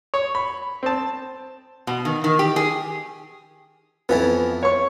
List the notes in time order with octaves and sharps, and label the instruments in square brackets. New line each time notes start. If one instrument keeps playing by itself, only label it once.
[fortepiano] C#5
B5
C4 A5
[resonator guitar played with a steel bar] B2
D#3
D#3
G4
G#4
[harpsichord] F2 E3 F3 [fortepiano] B3
[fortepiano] C#5 C#6